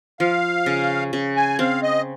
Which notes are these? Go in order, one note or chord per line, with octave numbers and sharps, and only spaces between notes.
F3 F5
C#3
C#3
G#5
C4 F5
D#5